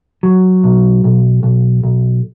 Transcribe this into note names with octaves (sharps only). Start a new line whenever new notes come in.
F#3
B1
B1
B1
B1